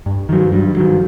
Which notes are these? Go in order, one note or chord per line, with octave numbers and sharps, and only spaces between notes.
G2
D#3 F#3
G2
D#3 F#3